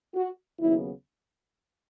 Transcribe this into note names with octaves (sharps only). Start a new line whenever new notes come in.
F#4
D#2 C#3 F#3 B3 E4